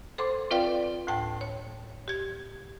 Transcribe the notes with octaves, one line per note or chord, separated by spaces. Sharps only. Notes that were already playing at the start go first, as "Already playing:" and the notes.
A4 C5 C6 D6
C4 F4 B4 D5 F5 G5
D2 A2 G5 A5
C#5
G4 G#6